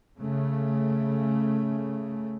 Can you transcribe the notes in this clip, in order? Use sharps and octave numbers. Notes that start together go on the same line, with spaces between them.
C#3 A3